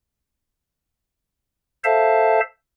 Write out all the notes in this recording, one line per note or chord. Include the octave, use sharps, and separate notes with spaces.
A4 C5 E5 F5 A5